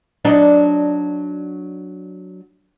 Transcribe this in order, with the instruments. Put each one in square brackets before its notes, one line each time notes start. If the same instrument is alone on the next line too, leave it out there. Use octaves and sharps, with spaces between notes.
[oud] F#3 D4 D#4